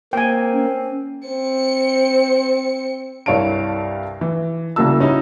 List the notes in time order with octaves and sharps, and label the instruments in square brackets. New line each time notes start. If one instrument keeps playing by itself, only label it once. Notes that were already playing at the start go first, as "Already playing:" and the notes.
[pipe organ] A#3 [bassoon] C4 [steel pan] G5 G#5
[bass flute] C#4
[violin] C4 C#7
[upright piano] C2 G2 C#5 F5 A5 D7
E3
C2 C#3 A#3 F#4 A5 E6
C#4 D#4 E4 F#4